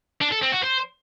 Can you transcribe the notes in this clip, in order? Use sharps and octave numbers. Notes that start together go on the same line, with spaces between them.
D4
A4
C4
F#4
C5